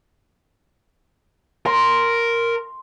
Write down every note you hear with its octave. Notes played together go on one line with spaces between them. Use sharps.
A#4 C6